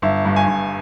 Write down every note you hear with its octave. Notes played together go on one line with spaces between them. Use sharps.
G1 E5
G2
G#5
G1